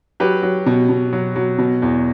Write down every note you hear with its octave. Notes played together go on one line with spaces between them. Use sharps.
F#3 G4 B4
F#3
B2
B2
F#3
F#3
B2
E2